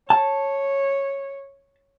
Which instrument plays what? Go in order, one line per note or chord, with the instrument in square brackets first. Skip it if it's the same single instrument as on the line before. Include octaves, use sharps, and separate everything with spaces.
[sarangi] C#5 [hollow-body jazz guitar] A5